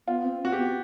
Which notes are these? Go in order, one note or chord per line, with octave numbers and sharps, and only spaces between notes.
B3 F4
C4
C4 F#4
G4
B3